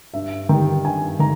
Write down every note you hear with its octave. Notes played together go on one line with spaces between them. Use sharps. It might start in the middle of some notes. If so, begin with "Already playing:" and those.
G2 E5
D#3 G3 G5
G2 G#5
D#3 A#5